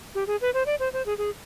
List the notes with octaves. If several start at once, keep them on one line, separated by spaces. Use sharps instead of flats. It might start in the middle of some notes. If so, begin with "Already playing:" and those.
G4
G#4
B4
C5
D5
C5
C5
G#4
G#4